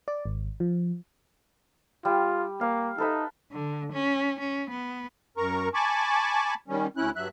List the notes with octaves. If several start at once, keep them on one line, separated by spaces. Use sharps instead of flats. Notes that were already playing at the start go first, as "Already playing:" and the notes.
D5
G#1
F3
G3 F4
A#3 F5
D#4 A4 B4 E5
D3
C#4
C#4
B3
F#2 A#4 A#5 C#6
G#5 A5 B5 C#6 D6
D#3 G3 C#4
D2 C#4 E4 F#6
G2 F#3 E5 F#6